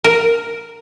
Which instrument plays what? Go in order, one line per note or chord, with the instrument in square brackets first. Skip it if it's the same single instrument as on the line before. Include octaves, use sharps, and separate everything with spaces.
[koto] A#4